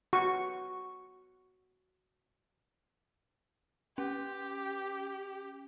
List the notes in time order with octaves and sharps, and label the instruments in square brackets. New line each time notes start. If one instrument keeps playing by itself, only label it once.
[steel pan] F#4 C#6
[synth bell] C#4 [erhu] G4